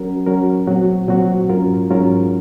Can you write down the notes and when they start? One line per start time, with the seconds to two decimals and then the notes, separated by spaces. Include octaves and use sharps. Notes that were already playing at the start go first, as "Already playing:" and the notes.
Already playing: F#3 C#4 F#4 A#4
0.27 F#3 C#4 F#4 A#4
0.67 A#2 F#3 C4 F#4
1.08 A#2 F#3 C4 F#4
1.49 G#2 F#3 C#4 F4 A#4
1.90 G#2 F#3 C#4 F4 A#4